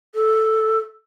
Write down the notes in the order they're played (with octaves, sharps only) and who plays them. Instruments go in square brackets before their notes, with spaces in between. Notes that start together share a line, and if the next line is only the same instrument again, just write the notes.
[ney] A4